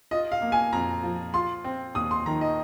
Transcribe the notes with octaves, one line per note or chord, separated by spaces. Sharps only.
F4 D#5
F5
A#3
G#5
F2 A#5
F3
F4 C6
C4
D#2 D#6
C6
D#3 A#5
D#5